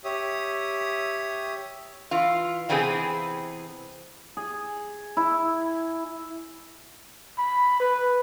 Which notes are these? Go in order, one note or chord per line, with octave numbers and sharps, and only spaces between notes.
G4 C#5 E5 D#6
E3 F4
C3 E3 B3 C4 D4 G#4
G#4
E4
B5
B4